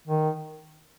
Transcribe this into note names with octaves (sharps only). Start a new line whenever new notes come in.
D#3